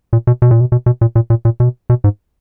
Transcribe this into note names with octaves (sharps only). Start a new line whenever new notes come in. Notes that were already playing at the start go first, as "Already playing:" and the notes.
A#2
B2
B2
A#2
B2
B2
B2
A#2
A#2
A#2
A#2
B2
B2
G#2